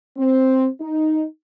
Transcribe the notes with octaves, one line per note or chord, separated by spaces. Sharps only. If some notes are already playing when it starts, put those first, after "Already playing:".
C4
D#4